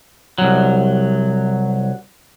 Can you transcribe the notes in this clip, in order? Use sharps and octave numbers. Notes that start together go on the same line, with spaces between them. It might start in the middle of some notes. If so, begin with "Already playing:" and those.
C2 F#3